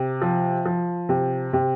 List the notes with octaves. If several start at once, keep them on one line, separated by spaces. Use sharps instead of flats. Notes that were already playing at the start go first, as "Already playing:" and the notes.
Already playing: C3
F3
F3
C3
C3